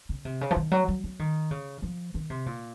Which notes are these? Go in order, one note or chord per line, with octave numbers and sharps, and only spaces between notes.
C#3
C3
C#3
F3
D#3
F#3
F#3
F#3
D#3
C#3
F3
D#3
C3
A#2